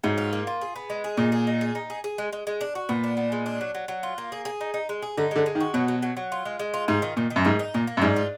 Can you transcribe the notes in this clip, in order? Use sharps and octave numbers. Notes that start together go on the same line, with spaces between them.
G#2 F#3
F4
A#3
F4
G#4
B3
G#3
G#4
A#2 D#4
G#4
D#4
G#4
D#4
G#4
G#4
G#3
G#3
G#3
D4
F#4
A#2 B3
D4
B3
G#3
D4
F#3
F#3
F#3
F4
A#3
G#4
G#4
D#4
D#4
G#3
G#4
D3 D#4
D3 G#3
G#3
D#3
F#4
B2 F#3
F#3
F#3
F#3
F4
G#3
G#3
F4
G#2 F4
D#3
A#2 D#3
D#3
F#2
G#2 D#3
D#4
A#2 A#3
A#3
F#2
G#2 D4
F4